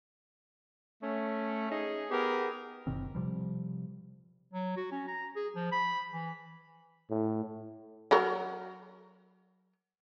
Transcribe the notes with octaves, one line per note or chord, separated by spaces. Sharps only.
A3 C#4
C#4 D#4 G#4
B3 G4 G#4 A#4
F#1 B2 D#3 C4
C3 F3 G3
F#3
F#4
C#4
A#5
G#4
F3
B5
E3
A2
F#3 F#4 A#4